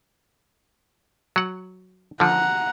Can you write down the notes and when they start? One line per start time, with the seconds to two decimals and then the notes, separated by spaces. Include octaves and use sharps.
1.36 F#3 F#5
2.20 D3 F3 F#5 A#5